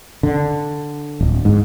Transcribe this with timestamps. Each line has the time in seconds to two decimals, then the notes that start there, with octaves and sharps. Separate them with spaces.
0.23 D3
1.21 D1
1.45 G#2